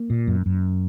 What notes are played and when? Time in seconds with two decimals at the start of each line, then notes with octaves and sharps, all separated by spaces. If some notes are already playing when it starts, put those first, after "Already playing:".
Already playing: A#3
0.10 A#2
0.27 F#2
0.46 F#2